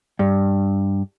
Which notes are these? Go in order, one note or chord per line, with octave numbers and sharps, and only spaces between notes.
G2